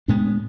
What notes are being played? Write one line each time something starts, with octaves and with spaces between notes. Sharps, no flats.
A2 G#3 B3 D4